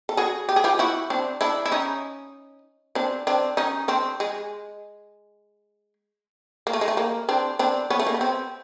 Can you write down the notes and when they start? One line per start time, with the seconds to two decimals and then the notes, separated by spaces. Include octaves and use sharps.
0.09 A4
0.17 F#4 G#4
0.49 G4
0.56 G#4
0.64 F4 G4
0.79 E4 F#4
1.10 C4 D4
1.41 D4 E4
1.66 E4
1.71 C#4 D#4
2.95 C4 D4
3.27 C4 D4
3.57 C#4 D#4
3.88 C4 D4
4.20 G#3
6.67 A#3
6.73 A3
6.81 G#3
6.88 A3
6.97 A#3
7.29 C4 D4
7.59 C4 D4
7.90 B3 C#4
8.00 A3
8.06 A#3
8.14 B3
8.21 C4